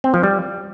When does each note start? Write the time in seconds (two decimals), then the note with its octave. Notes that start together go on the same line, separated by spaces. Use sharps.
0.04 C4
0.14 F3
0.23 G3